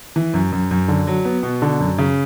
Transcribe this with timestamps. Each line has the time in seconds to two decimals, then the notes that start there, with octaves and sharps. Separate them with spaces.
0.16 E3
0.34 F#2
0.52 F#2
0.71 F#2
0.88 D3
1.07 F#3
1.25 B3
1.43 B2
1.62 D3
1.80 F#2
1.98 C#3